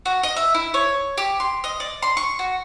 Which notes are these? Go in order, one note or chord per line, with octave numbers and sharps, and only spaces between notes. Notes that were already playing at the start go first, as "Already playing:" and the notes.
F#4
D#5
E5
E4
C#5
G4
C6
D#5
D5
C6
C#6
F#4